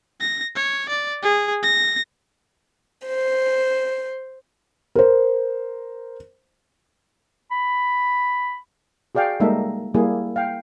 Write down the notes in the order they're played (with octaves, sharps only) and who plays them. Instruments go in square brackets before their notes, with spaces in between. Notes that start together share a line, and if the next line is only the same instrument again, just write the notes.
[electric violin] A#6
C#5
D5
G#4
A#6
[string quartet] C5
[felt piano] A#4 C5
[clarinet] B5
[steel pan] F#4 G#4 D5 F5 G5
G3 G#3 A#3 D#4 A4 E5
G3 A#3 E4 G#4
F5 G5